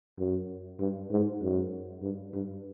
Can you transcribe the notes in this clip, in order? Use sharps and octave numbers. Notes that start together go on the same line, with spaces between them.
F#2
G2
G#2
F#2
G2
G2